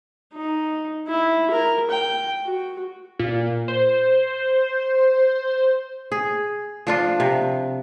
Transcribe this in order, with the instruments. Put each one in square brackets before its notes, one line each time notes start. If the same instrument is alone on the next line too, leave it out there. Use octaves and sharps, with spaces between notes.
[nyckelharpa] D#4
E4
A#4
G5
F#4
[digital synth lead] A#2
C5
[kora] G#4
F3 D4 F4
C3